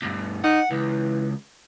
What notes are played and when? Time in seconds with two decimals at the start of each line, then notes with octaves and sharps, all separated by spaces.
0.02 D2 G2
0.44 D#4 F#5
0.71 C#2 E3